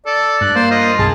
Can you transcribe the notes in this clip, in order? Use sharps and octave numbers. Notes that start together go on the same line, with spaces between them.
A4 D5
G2 F#6
A#3 C5
F4 D#5
B1 F#2 G#4 A5